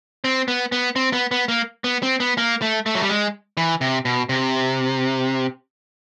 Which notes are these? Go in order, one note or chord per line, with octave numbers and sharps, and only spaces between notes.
C4
B3
B3
C4
B3
B3
A#3
B3
C4
B3
A#3
A3
A3
F#3
G3
G#3
E3
C3
B2
C3